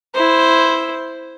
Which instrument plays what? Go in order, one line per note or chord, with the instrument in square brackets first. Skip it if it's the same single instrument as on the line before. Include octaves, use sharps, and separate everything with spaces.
[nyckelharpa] E4 C5